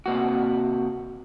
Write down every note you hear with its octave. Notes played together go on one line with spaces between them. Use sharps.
C3 A#3 F#4